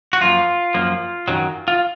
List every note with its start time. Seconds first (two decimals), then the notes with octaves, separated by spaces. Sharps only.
0.13 F#4
0.21 F#2 F3 A#3 F4
0.74 F#2 F3 A#3
1.28 F#2 D#3 F#3
1.68 F4